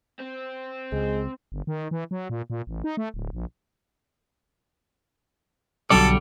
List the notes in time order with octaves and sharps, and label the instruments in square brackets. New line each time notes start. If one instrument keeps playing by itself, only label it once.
[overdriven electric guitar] C4
[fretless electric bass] C#2 [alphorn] G#3
[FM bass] G1
D#3
E3
F#3
A#2
A#2
A1
D#4
A3
D1
A#1
[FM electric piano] B1 F#3 C#7 [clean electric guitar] D3 G3 D5 [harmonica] A4